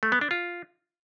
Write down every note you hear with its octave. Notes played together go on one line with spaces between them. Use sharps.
A3
B3
D4
F4